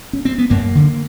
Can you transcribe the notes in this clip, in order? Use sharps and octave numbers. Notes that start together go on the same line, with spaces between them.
C#4
C4
B3
F#2 A#3
D3